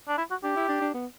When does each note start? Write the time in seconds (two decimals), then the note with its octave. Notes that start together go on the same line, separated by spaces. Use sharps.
0.08 D4
0.18 E4
0.31 F#4
0.43 D4 G4
0.56 E4
0.69 D4
0.82 D4
0.94 B3